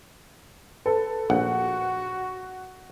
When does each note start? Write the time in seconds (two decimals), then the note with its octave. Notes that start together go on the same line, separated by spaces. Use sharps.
0.86 A4 B4
1.30 A#1 F#4 F#5